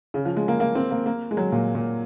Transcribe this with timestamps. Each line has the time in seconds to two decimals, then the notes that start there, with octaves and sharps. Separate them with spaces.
0.14 C#3
0.25 F3
0.36 G#3
0.48 A#3
0.60 A#3
0.75 C4
0.91 A#3
1.06 A#3
1.31 G#3
1.37 F#3
1.52 A#2
1.75 A#2